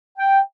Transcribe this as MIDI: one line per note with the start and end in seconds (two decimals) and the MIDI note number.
0.18 0.39 79